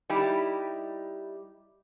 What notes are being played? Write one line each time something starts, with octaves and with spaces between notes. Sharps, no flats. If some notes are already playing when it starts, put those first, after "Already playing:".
G3 D#4 E4 G4